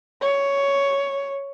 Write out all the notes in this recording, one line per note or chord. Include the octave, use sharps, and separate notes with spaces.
C#5